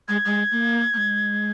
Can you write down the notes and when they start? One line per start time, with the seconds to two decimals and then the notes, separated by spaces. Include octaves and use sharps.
0.08 G#3 G#6
0.25 G#3
0.52 A#3
0.94 A#3
0.97 G#3